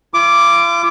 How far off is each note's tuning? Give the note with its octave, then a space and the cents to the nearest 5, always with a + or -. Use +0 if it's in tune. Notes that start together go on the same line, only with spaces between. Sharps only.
F4 -45 D6 +0